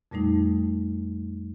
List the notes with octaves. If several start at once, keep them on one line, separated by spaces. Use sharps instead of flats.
F2 A#2 G3 A3 D#4